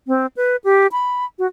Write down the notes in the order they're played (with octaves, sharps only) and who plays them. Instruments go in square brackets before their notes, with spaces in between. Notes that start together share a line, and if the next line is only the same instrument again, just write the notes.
[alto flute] C4
B4
G4
B5
F#4